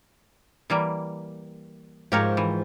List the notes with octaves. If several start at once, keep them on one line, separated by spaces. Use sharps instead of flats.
E3 G3 A#3
G#2 F3 G4 A#4 C#5
E3